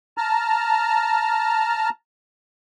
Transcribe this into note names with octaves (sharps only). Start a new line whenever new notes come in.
A5 A#5 F6